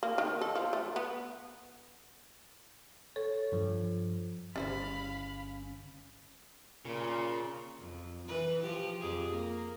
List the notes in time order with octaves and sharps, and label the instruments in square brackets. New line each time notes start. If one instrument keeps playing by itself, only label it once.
[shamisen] A#3
D#3
A4
F3
A3
B3
[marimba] A4 [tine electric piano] C#5
[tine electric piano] G2 F3
[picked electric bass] G1 C#3 [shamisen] G3 E4 C5 [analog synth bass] C#4 [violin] F5 B5
[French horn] A#2 [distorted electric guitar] C#3
[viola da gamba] F2
E3 B4
F3 G4
F2 G4 G#4
A#3